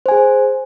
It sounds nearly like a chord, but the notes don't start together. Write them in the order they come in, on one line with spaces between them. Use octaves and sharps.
C5 G#5 G#4